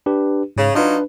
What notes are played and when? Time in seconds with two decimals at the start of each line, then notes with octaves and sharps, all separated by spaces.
0.06 D4 G4 B4
0.56 G#2 C#3
0.75 F#3 D4 D#4 F4 B4